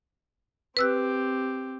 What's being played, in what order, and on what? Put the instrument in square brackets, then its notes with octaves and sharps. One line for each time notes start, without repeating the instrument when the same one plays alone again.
[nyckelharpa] C4 G4 [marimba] B4 E6 F#6